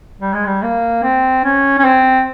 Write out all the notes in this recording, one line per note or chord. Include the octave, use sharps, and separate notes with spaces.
G3
G#3
G3
A#3
C4
C#4
C#4
C4